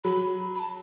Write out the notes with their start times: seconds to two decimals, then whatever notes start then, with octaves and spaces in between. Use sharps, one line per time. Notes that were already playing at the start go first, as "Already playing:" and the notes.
0.04 F#3 B5
0.55 B5
0.59 A5